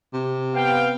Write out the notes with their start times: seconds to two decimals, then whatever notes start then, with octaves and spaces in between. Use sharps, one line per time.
0.14 C3
0.55 B3 F5 G5